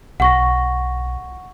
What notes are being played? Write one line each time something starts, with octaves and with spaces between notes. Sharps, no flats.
B1 F#5 C#6 A#6